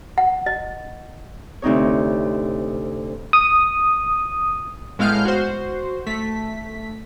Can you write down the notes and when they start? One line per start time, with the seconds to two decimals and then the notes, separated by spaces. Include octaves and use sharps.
0.18 F#5
0.46 D#5
1.62 D2 C3 C4 D#4 C#5
3.33 D#6
4.99 A2 G#3 B3 F5 F6 G6
5.25 F#4 C5
6.07 A3 B6